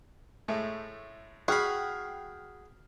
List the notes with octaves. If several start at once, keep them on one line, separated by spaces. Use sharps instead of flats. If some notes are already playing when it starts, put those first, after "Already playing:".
A2 G#3 A3
F#4 G#4 G5 B5 F6 C7